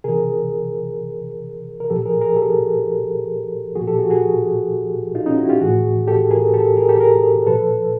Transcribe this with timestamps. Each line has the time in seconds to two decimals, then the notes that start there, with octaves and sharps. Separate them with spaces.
0.04 C3 E3 G#4 A#4
1.80 A#4
1.90 A#2 F3 G4 A4
2.06 G#4 A#4
2.21 G#4 A#4
2.36 G4 A4
3.76 A#2 F3 F#4 G#4
3.87 G4 A4
3.99 F#4 G#4
4.10 F#4 G#4
5.15 D#4 F4
5.26 C#4 D#4
5.38 E4 F#4
5.49 F4 G4
5.61 A2 E3 F#4 G#4
6.08 G4 A4
6.31 G#4 A#4
6.54 G4 A4
6.77 G#4 A#4
6.89 G4 A4
7.00 G#4 A#4
7.47 A#2 F3 A4 B4